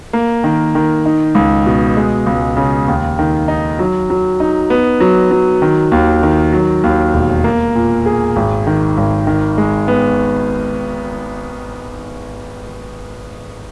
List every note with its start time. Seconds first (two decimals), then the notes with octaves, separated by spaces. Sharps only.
0.13 A#3
0.44 D#3
0.75 D#3
1.06 D#4
1.35 C#2
1.66 B2
1.97 G#3
2.26 C#2
2.57 C#3
2.88 D#2
3.19 D#3
3.48 D#4
3.79 F#3
4.10 F#3
4.40 D#4
4.70 B3
5.00 F#3
5.31 F#3
5.62 D#3
5.92 D#2
6.23 D#3
6.53 F#3
6.84 D#2
7.14 E1
7.44 A#3
7.75 A#2
8.06 G#4
8.36 G#1
8.67 D#3
8.97 G#1
9.27 D#3
9.58 G#3
9.88 B3